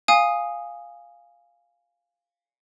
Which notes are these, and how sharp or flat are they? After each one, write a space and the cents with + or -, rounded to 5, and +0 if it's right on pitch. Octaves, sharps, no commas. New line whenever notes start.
F5 +0 G#5 -10 D#6 +0